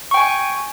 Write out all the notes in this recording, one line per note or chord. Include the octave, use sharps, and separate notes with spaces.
G5 G#5 C#6